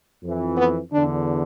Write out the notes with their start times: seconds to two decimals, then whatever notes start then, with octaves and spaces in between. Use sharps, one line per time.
0.24 F2 E3
0.57 B3
0.92 E2 D3 D4